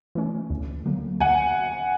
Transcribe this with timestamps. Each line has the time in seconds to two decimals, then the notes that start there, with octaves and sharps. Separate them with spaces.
0.15 E3 A3 C#4
0.50 D2
0.85 D3 F#3 A#3
1.20 D2 F#5 G#5